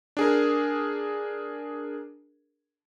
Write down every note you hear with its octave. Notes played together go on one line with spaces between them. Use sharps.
D4 G#4 A#4